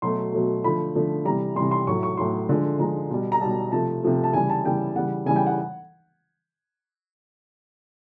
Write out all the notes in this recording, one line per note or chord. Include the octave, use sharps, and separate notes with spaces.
B2 F#3 A3 C6
B2 F#3 A3
D3 F3 A3 B5
D3 F3 A3
C3 E3 G3 A#5
C3 E3 G3 C6
C6
A2 F#3 A3 C#6
C#6
A2 F#3 A3 C6
D3 F3 G#3
D3 F3 G#3 A#5
B2 G3
A#5
B2 G3 A5
C3 F3 A3 A5
C3 F3 A3
A5
C#3 E3 G3 G#5
A5
C#3 E3 G3 G5
C#3 E3 G3 F#5
C#3 E3 G3 G#5
G5
F#5